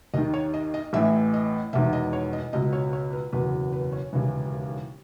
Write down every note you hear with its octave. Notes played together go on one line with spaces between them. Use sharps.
D#2 D#3 D#5
C#5
D#5
D#5
A1 A2 E3 E5
D#5
E1 E2 D#3 E5
D#5
C#5
D#5
C#2 B2 D#5
C#5
C#5
B4
F#1 E2 B2 B4
B4
C#5
E1 D#2 C#3 E3